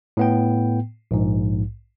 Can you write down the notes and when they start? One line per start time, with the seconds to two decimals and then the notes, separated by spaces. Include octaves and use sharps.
0.17 A2 B3 G5
1.11 A#1 G#2